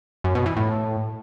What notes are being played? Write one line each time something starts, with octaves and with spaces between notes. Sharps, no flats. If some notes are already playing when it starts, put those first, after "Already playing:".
F#2
B2
E3
A2